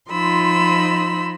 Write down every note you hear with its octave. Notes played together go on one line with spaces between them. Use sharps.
F3 D#4 F4 B5 C6 E6